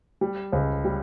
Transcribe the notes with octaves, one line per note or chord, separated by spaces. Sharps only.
G3
C#2
G3